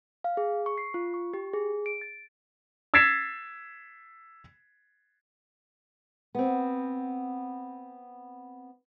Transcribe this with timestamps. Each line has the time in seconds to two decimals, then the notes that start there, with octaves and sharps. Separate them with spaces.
0.24 F5
0.37 G#4
0.66 C#6
0.78 C7
0.94 F4
1.14 C#6
1.34 G4
1.53 G#4
1.86 D7
2.01 A6
2.94 E6 G#6 A6 B6 C7 E7
6.35 B3 C4